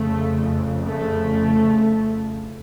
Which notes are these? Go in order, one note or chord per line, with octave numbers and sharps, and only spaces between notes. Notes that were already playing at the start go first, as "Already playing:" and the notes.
Already playing: F2 C#3 A3
A3